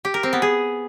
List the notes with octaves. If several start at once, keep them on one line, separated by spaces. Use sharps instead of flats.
G4
A#4
C4
B3
G#4